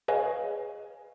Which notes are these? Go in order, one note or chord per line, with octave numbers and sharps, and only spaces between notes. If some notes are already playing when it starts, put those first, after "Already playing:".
G#4 B4 C#5 D#5 F5 G#5